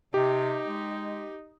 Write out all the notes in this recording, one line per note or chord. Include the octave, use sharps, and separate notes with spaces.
C3 D#4 G4
G#3